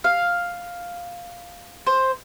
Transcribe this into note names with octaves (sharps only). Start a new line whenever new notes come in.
F5
C5